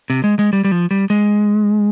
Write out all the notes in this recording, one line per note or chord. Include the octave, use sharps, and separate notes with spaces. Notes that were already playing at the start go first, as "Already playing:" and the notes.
C3
G#3
G#3
G3
G3
F3
G3
G#3